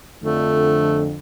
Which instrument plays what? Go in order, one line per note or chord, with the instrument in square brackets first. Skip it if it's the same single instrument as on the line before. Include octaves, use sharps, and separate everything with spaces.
[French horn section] F2 D3 [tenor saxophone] A3